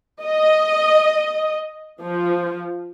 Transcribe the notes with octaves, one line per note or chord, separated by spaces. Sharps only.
D#5
F3